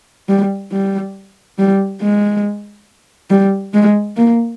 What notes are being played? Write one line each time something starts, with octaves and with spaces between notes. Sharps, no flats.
G3
G3
G3
G#3
G3
G#3
A#3